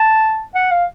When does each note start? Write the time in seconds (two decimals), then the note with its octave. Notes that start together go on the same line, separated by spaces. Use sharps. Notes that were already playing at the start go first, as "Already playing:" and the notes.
Already playing: A5
0.55 F#5
0.71 F5